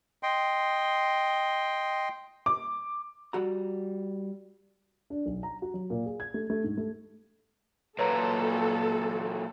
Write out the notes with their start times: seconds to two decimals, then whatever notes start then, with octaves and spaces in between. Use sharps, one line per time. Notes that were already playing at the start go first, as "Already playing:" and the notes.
0.23 D#5 G5 C6
2.46 D6
3.33 G3 F#4 A#5
5.10 D4
5.26 B1
5.43 A#5
5.62 F#4
5.74 F#3
5.90 A#2
6.06 G#4
6.20 G#6
6.34 A3
6.50 A3
6.64 G#2
6.77 A3
7.99 A#2 F#3 A4 B4 C#5 A#5